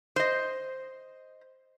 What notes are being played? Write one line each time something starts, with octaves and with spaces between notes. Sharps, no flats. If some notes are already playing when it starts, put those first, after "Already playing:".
C5 D#5